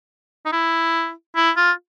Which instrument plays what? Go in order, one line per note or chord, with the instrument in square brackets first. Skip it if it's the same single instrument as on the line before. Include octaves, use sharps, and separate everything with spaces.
[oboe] D#4
E4
E4
F4